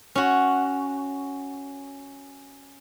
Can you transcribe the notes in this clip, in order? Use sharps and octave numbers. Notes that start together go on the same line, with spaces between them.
C#4 F#4